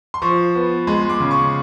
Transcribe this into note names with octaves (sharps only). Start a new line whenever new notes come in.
C6
F3 C#6
B3
G#3 C6
D6
C#3
C#6